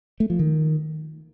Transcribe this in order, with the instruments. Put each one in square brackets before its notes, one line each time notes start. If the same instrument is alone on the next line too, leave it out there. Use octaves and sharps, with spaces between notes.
[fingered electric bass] A3
F3
D#3